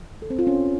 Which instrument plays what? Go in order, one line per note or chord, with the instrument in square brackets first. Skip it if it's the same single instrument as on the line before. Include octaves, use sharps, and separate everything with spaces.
[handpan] A4
C4
F4
C#4